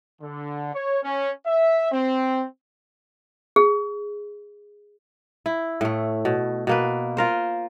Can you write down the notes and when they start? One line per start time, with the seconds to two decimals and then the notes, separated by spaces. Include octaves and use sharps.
0.22 D3
0.74 C#5
1.04 C#4
1.47 E5
1.92 C4
3.56 G#4
5.46 E4
5.81 A2 A3
6.25 B2
6.67 B2 A#3 B4
7.17 F4 A#4 C5